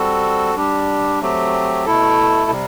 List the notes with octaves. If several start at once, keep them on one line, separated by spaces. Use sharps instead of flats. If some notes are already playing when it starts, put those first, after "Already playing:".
Already playing: G3 C4 F#4 A4
G3 D4 G4
F#3 A3 C4 G4
B2 A3 E4 A4
C3 G3